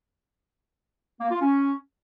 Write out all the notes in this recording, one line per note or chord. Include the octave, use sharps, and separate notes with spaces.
A#3
F4
C#4